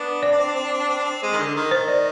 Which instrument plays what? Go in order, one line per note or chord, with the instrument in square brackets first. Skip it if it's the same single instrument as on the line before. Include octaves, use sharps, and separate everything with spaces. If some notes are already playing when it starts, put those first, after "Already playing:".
Already playing: [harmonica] B3 D4
[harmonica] C4 [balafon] D5
[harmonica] D4
C4
D4
C4
D4
C4
D4
C4
D4
C4
G#3
D#3
D3
D#3
[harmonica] D#3 [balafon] C5
[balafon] D5